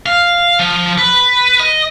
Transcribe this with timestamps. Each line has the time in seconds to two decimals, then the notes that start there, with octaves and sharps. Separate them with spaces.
0.06 F5
0.59 F3
0.98 B4
1.60 D#5